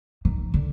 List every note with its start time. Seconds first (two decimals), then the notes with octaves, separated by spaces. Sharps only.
0.25 D#3
0.54 D3